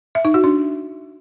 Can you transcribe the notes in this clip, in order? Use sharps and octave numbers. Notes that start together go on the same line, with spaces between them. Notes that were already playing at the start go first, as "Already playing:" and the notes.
E5
D#4
F#4
D4